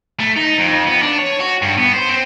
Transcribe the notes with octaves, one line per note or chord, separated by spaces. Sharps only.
A3
D#4
F2
B3
D4
C#5
F#4
G2
B3
C5
C4